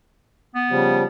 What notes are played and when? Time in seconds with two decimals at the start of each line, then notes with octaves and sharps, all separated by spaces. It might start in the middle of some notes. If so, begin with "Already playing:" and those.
0.55 B3
0.70 C#3 F3 G3